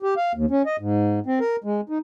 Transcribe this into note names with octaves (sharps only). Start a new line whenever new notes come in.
G4
F5
D#2
C#4
D#5
G#2
C4
A#4
G#3
D#4